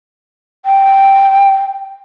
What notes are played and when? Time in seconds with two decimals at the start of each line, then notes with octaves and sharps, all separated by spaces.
0.65 G5